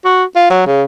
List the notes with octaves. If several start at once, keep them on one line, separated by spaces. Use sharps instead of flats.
F#4
F4
F#3
C#3